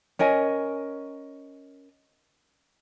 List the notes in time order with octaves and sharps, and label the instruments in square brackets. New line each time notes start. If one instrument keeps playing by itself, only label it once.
[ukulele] C#4 A#4 D#5 G#5